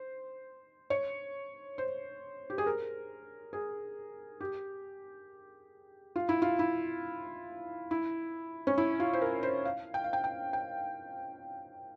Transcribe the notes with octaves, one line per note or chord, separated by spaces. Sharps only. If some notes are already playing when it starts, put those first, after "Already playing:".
Already playing: C5
C#5
C5
G4
G#4
A#4
G#4
G4
F4
E4
F4
E4
E4
C#4
E4
F4
C5
A#4
C5
F5
G5
F5
G5
G5
G5